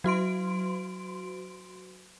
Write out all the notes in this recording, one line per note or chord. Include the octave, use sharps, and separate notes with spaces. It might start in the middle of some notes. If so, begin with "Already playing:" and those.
F#3 F#4 C6 D7